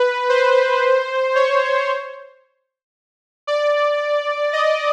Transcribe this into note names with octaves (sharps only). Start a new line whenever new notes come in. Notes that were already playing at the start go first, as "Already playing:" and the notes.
Already playing: B4
C5
C#5
D5
D#5